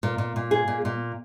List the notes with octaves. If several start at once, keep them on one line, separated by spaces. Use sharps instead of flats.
A#2
A#2
A#2
G#4
A#2
A#2